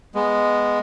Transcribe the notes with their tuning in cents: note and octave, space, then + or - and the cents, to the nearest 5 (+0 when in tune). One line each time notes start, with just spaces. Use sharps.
G#3 +0 B3 +0